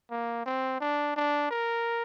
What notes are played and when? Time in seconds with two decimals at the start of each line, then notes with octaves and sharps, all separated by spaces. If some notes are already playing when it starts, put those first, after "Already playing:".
0.11 A#3
0.46 C4
0.80 D4
1.16 D4
1.51 A#4